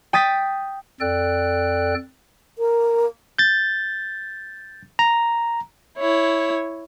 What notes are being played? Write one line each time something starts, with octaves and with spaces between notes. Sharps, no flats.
G5 D#6 A6 B6
F2 A4 D5 G5 F#6
A#4
G6 A6
A#5
E4 C#5